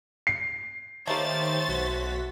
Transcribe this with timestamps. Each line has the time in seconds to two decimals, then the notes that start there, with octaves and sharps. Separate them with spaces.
0.27 C7
1.07 D#3 A3 A#3 G4 C5 C#5 A6
1.68 B1 F#4 B6